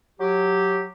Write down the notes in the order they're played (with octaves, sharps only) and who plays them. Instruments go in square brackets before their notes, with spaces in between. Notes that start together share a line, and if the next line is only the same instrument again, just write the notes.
[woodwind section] F#3 G4